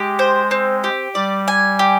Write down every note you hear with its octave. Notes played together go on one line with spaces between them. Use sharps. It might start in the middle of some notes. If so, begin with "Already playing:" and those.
Already playing: G#3 G4
C5
C4
G4
G3 D5
G#5
G4